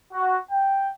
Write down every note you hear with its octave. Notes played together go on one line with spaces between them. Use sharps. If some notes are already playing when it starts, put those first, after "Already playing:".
F#4
G5